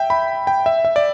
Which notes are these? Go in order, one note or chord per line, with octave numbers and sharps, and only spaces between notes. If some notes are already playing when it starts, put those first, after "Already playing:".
Already playing: E5 G5
B5
G5
E5
E5
D5